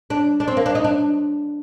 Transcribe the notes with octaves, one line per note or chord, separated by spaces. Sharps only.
D4
D4
C4
A#3
D4
D#4
D4